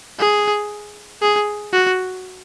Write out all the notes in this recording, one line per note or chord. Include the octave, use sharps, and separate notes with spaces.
G#4
G#4
F#4